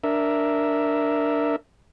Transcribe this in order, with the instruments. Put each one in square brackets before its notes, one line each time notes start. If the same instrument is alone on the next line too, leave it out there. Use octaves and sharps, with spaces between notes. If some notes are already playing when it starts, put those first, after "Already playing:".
[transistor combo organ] D4 A#4 E5